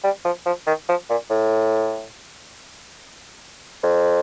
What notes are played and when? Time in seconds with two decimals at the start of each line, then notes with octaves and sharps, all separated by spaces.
0.04 G3
0.25 F3
0.46 F3
0.67 D#3
0.89 F3
1.10 A#2
1.30 A2
3.83 F2